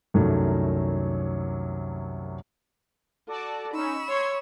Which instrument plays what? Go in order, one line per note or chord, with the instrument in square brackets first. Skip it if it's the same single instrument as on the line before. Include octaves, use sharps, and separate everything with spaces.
[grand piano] C2 F#2 D#3 F#3 A3
[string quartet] F#4 [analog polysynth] A4 D5 A5
[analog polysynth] C#4 D#4 [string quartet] B5 C#6 E6
[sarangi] C#5 [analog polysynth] C6 G#6